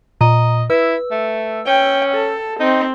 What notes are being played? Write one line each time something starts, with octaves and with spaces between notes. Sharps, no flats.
A#2 D#5 A#5
E4 B4 E6
A3
C#4 G5
A4
C4 D#4